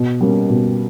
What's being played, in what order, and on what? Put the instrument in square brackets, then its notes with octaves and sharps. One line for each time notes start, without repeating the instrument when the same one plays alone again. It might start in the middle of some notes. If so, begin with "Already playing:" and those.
Already playing: [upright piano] B2
G3 A#3 C#4
B2